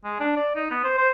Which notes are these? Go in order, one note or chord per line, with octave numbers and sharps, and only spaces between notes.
G#3
D4
D5
D#4
B3
C5
C5